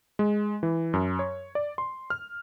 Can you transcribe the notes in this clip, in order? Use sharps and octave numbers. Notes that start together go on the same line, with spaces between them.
G#3
E3
F#2
C#5
D5
C6
F6